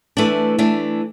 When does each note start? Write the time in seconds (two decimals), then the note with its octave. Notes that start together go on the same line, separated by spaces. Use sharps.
0.17 E3 A3 D4
0.58 E3 A3 D4